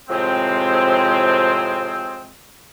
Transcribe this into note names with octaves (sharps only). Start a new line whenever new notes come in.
A2 C3 F3 G#3 C4